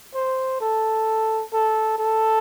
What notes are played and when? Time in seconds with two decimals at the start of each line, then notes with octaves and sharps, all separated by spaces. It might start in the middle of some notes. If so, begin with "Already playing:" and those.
0.15 C5
0.61 A4
1.53 A4
1.98 A4